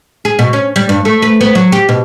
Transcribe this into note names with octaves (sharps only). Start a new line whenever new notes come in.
G#4
B2
C#4
G3
G2
A3
B4
B3
F#3
G4
B2